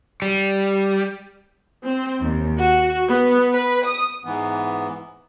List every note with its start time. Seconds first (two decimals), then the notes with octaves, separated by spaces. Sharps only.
0.22 G3
1.84 C4
2.22 D#2
2.59 F#4
3.09 B3
3.54 B4
3.85 D#6
4.25 G#2 E3 B3